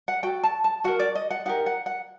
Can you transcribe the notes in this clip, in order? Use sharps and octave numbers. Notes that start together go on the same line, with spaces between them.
F#5
F#4 A4 G5
A5
A5
F#4 A#4 F#5
D5
D#5
F#5
D#4 G4 A#4 F#5
F#5
F#5